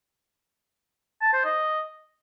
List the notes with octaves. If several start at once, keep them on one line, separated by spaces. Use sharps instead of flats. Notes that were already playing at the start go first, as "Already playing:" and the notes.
A5
C5
D#5